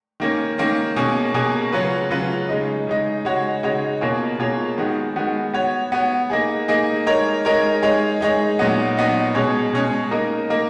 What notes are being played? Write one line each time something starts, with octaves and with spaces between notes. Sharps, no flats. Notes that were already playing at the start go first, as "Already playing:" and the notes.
D#3 A#3 C#4
D#3 A#3 C#4
B2 A#3 C#4 G#4
B2 A#3 C#4 G#4
C#3 F#3 C#4 F4 B4
C#3 F#3 C#4 F4 B4
C#3 G#3 D#4
C#3 G#3 D#4
C#3 G#3 D#4 F#4 C#5
C#3 G#3 D#4 F#4 C#5
B2 A#3 F4 G#4 C#5
B2 A#3 F4 G#4 C#5
D#3 G#3 B3 F#4
D#3 G#3 B3 F#4
B3 F#4 C#5
B3 F#4 C#5
A#3 D#4 G#4
A#3 D#4 G#4
G#3 D#4 A#4 C#5
G#3 D#4 A#4 C#5
G#3 D#4 G#4 C#5
G#3 D#4 G#4 C#5
A#2 F#3 B3 D#4
A#2 F#3 B3 D#4
B2 G#3 C#4 G#4 C#5
B2 G#3 C#4 G#4 C#5
A#3 D#4 A#4 D#5
A#3 D#4 A#4 D#5